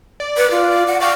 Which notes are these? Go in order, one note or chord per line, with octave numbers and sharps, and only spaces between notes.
D5
B4
F4
F#5
D5 F5 G5 C#6